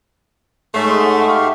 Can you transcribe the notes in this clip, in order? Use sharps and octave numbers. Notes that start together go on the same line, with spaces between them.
G#2 A3 C#5 C#6 C7
G#3 C6 D#6
E5 F#5 C#6
G4 F5